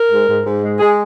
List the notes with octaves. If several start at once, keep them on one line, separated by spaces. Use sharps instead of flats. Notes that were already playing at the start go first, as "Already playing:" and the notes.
Already playing: A#4
G#2
G#2
G#2
G#3
G#3 G#4